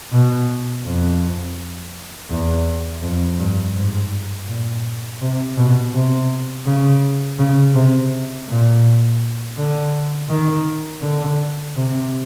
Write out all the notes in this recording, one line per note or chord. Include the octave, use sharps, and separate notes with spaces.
B2
F2
E2
F2
G2
G#2
A#2
C3
B2
C3
C#3
C#3
C3
A#2
D3
D#3
D3
C3